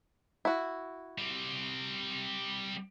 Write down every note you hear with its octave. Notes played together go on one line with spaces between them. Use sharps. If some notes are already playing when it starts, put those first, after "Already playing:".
E4 F#4
G3 C4